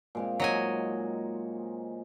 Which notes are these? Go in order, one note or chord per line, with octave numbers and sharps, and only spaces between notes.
A#2 G#3 C4
A#2 F#3 G#3 D#4 D#5 G#5